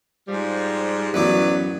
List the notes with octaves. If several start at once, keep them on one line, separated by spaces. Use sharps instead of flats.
G#2 F3 G3
A1 F#2 F#3 B3 E4 B4 D5